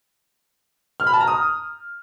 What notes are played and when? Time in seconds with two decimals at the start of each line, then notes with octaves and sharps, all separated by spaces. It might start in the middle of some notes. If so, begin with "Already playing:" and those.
1.00 F6
1.07 B5
1.14 A5
1.21 A#5
1.28 D#6